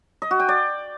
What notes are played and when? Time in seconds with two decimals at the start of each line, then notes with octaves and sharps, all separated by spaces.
0.22 D#5
0.31 F#4
0.40 G5
0.49 D5